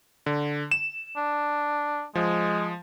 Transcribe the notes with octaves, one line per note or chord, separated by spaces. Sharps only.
D3
E7
D4
F3 G#3